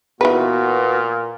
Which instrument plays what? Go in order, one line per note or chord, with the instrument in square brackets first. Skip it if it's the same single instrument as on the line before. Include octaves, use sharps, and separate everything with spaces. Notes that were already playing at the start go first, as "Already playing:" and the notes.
[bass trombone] A#2 [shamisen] E3 D#4 B4 [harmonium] B3 F#4